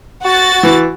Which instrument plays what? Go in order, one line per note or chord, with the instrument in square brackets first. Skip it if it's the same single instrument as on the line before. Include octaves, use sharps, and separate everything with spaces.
[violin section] F#4 A6
[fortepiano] E3